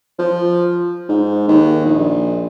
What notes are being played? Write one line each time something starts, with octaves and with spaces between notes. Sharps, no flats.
F3
G#2
D#2
A#1